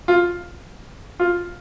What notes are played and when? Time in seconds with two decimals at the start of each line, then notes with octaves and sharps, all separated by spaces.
0.08 F4
1.20 F4